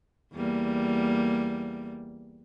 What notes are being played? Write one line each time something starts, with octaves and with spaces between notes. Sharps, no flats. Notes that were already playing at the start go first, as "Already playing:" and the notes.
E2 G3 A#3